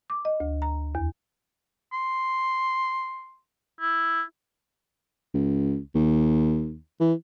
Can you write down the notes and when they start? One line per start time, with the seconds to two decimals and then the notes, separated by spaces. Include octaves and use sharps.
0.10 D6
0.25 D#5
0.40 D2
0.62 A#5
0.95 E2
1.93 C6
3.81 E4
5.34 C#2
5.95 D#2
7.00 E3